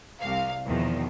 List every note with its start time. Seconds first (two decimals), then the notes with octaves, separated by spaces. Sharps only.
0.19 C2 F5
0.66 E2 B2 D#3 F3